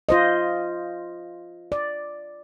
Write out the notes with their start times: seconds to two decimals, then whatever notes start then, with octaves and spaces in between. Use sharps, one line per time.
0.09 F4 C5 D#5
1.72 D5